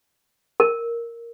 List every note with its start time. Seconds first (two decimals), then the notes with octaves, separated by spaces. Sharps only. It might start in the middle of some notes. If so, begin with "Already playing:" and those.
0.60 A#4